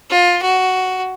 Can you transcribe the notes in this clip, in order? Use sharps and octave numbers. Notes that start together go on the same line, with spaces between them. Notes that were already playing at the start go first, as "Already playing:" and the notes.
F4
F#4